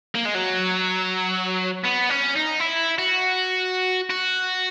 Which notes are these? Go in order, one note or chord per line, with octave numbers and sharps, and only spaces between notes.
A#3
G#3
F#3
B3
C#4
D#4
E4
F#4
F#4